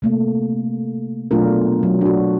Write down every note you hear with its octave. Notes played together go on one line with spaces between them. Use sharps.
C3 A3 A#3
B2 F#3 A3 D4 F4 A#4
F#3
D4 F#4